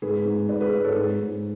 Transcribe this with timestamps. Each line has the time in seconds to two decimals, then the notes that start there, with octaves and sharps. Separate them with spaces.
0.02 G#2 G#4 B4
0.25 G#2
0.48 G#2 B4 D5
0.60 G#4 B4
0.72 G#2
0.84 A4 C#5
0.95 G#2 G#4 B4
1.19 G#2